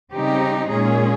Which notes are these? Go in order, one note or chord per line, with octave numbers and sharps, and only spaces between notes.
C#3 G3 C4 D#4 G4
A#2 G#3 C#4 G#4